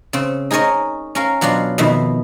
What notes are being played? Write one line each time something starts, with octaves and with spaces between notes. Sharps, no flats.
C#3 C4
D#4 G#4 A#4 C#5 D#5
C#4 A#4 F5
B2 F#3 D4 F4 F5
F2 B2 D#3 E5